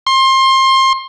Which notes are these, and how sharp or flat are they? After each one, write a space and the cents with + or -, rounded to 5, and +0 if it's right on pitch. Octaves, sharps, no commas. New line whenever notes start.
C6 +25